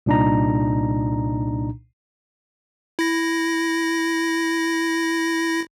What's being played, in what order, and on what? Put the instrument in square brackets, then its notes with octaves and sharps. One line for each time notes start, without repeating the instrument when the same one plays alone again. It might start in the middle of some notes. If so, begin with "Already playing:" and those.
[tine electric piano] C2 A#2 D4 D#4 A#5
[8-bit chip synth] E4 A#6